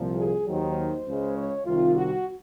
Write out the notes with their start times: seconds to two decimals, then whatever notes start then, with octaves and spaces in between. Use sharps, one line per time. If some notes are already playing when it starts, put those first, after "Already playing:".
Already playing: C2 A#2 F3
0.16 G#4
0.45 D#2 D#3 F#3 C5
1.06 C#2 C#3 G#3
1.35 C#5
1.65 C2 C3 D#3 F4
1.94 F#4